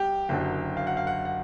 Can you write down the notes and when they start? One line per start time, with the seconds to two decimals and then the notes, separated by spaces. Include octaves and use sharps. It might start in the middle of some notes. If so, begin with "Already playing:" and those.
Already playing: C2 G4 G5
0.29 F#1 F#2 D3 F#3
0.77 F5
0.87 F#5
0.97 F5
1.07 F#5
1.25 F#5